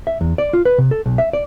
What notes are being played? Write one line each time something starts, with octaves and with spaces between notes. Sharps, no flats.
E5
E2
D5
F4
B4
C3
A4
B1
E5
D5